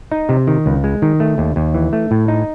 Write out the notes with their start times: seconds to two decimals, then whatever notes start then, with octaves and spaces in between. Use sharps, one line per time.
0.12 D#4
0.29 C3
0.47 D#3
0.66 C#2
0.84 G#3
1.02 D#3
1.20 A3
1.38 D#2
1.56 D#2
1.74 E3
1.93 A3
2.11 A2
2.28 D#4